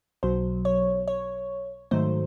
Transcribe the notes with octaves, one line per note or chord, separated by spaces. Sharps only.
B1 B2 F#3 C5
C#5
C#5
G#2 D#3 F#3 A3 C5